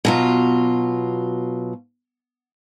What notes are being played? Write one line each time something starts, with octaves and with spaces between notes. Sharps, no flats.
B2 F#3 F4